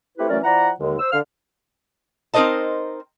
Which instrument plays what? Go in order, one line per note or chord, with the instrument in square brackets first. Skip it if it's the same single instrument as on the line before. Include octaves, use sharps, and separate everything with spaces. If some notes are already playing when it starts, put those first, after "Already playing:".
[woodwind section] A3 C4 E4 G4 B4
E3 F#3 A3 C#4 A#4 D5
F3 E4 D5 F#5 A#5
D#2 D3 G#3
C5 E6
D3 F5 F6
[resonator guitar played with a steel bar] C4 D#4 A#4 C5 D#5 A5